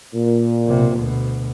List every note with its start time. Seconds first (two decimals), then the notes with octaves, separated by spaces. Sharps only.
0.14 A#2
0.66 B1 C3
0.98 D2 B2